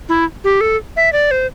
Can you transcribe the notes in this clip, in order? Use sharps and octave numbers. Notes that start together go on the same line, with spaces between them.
E4
G4
A4
E5
D5
C5